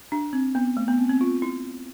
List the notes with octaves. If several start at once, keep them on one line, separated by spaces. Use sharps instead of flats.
D4
C4
B3
A3
B3
C4
C4
F4
E4